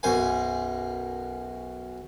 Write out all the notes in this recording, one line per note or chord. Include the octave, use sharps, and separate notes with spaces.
B1 F#2 C5 G#5